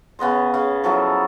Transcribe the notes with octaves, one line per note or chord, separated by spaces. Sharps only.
C#3 B3 D#5 C6
C#3
F3 F#3 E4 A4